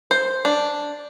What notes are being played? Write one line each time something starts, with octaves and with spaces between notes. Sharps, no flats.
C5
D4